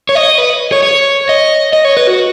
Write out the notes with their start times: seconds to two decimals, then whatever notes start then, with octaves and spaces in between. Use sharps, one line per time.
0.09 C#5
0.15 D#5
0.38 B4
0.72 C#5
0.83 C#5
1.29 D#5
1.73 D#5
1.85 C#5
1.97 B4
2.07 F#4